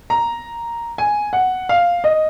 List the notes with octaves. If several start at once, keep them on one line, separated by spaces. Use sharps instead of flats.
A#5
G#5
F#5
F5
D#5